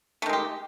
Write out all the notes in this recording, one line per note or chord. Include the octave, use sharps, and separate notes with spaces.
D#3 G#3 A3 G4